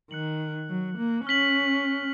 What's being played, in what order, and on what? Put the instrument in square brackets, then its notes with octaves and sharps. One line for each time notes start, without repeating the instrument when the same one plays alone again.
[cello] D#3 [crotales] F#6 C#7 F#7
[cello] F#3
A#3
[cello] C#4 [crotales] F6 B6 F#7